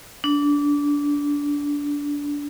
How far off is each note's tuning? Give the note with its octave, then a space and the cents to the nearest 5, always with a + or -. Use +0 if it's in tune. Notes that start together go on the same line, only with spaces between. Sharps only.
D4 -20